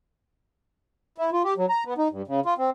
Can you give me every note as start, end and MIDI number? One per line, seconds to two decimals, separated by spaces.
1.18 1.30 64
1.32 1.42 65
1.44 1.54 67
1.57 1.66 54
1.69 1.84 82
1.85 1.94 59
1.98 2.08 63
2.11 2.22 43
2.28 2.40 49
2.46 2.54 65
2.58 2.70 60